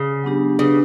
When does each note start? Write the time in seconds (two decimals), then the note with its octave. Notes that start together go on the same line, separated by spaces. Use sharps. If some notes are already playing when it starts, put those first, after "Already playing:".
Already playing: C#3
0.23 F#3 B3 D4 G4
0.59 C#3 D4 G4 B4